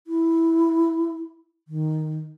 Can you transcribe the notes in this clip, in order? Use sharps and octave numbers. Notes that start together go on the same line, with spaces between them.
E4
D#3